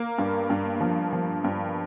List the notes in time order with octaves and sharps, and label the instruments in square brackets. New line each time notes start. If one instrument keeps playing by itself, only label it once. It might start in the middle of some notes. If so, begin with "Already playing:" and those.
Already playing: [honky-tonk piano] A#3
G2
G2
F3
F3
G2